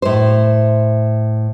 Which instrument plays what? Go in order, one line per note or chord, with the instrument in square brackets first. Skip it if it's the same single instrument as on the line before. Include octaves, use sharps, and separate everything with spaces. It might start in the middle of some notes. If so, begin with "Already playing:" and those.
[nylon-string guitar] A2 C5